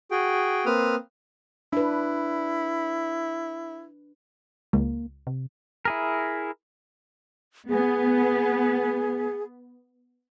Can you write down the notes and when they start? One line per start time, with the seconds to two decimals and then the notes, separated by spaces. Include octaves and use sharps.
0.11 F#4 G#4 G5
0.66 A#3 C4 B4 D#6 F6
1.73 D4 E4 B4
4.73 C#2 A#3
5.27 C3
5.85 E4 G#4 A#4
7.69 B3 G#4